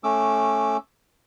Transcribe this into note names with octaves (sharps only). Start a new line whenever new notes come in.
A3 C#4 D6 E6